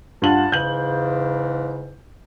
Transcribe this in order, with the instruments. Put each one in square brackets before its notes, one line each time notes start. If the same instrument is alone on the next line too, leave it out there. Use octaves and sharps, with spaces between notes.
[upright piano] G2 F4 F#7 [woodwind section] F#5 A5
[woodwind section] E2 G#2 C#3 [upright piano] G6 F#7